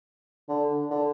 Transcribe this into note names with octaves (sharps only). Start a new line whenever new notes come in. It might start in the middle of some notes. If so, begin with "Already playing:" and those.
D3
D3